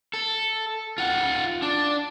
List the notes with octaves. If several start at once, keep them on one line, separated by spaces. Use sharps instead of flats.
A4
F4 F#5
D4